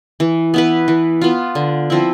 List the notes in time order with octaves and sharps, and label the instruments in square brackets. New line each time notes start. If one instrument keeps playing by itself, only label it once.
[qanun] E3
B3 E4 B4
E3
B3 F4
D3
F3 C4 E4